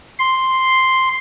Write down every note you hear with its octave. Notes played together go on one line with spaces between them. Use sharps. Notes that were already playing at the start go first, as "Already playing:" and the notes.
C6